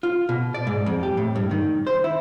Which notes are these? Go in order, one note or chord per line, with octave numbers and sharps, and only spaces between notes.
F4
B2
D5
G#2
F2
G4
A2
G2
D#3
C5
E4